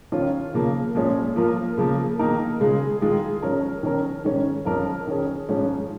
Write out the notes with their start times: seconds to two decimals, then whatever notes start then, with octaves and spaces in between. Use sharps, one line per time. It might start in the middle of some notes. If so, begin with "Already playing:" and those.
0.12 D#3 C#4 F4
0.54 C#3 F3 A#3
0.95 A#2 F3 G#3 C#4 G#4
1.36 F3 A#3 F4 A#4
1.78 C#3 F3 A#3
2.19 D#3 A#3 D#4 A#4
2.60 C#3 G#3 F4 G#4
3.01 D#3 G#3 F4 G#4
3.42 F3 C#4 A#4
3.83 D#3 C#4 A#4
4.25 G#2 D#3 C#4
4.66 F2 F3 C#4 A#4
5.07 D#3 C#4 G#4
5.49 G#2 F3 C#4